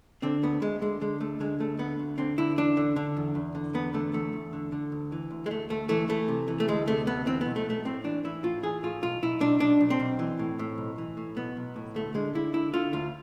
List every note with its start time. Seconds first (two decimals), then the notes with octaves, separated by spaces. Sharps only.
0.22 D3 C4
0.43 D2 B3
0.61 D2 G#3
0.81 D3 G#3
1.01 D3 G#3
1.20 D2 A3
1.40 D3 G#3
1.60 D2 A3
1.79 D3 B3
1.99 D2
2.18 D3 C4
2.38 D3 E4
2.57 E2 D4
2.77 D3
2.96 D3
3.17 E2
3.35 E2
3.55 D3
3.74 E2 B3
3.94 D3 A3
4.13 E2 A3
4.33 E2
4.53 D3
4.72 D3
4.92 D2
5.12 E3
5.31 D2
5.46 G#3
5.51 D2 A3
5.70 D2 A3
5.89 E3 A3
6.09 E3 A3
6.28 C3
6.48 E3
6.60 A3
6.68 D2 G#3
6.88 C3 A3
7.07 D2 B3
7.26 E3 C4
7.41 B1 B3
7.56 A3
7.66 B1 A3
7.85 A2 C4
8.04 E3 D4
8.24 E3 E4
8.43 A2 F4
8.63 E3 G#4
8.83 A2 F4
9.02 B1 F4
9.22 B1 E4
9.41 B1 D4
9.60 B1 D4
9.80 B1
9.90 C4
9.99 B1
10.19 E3
10.39 A2
10.59 A2
10.78 B1
10.98 E3
11.17 A2
11.37 B1 B3
11.57 B1
11.76 A2
11.95 D2 A3
12.14 D3 G#3
12.35 D3 E4
12.53 D3 E4
12.74 D3 F4
12.93 D2 F4